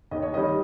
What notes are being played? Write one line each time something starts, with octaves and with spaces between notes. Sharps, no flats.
D#2 D#5
C#5
D#3 G3 D#5